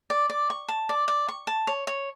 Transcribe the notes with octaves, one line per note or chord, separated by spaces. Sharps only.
D5
D5
C#6
A5
D5
D5
C#6
A5
C#5
C#5